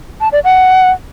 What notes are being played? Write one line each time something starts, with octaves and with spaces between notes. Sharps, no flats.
A5
D5
F#5